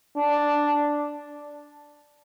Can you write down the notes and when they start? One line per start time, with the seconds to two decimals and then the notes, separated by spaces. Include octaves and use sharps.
0.17 D4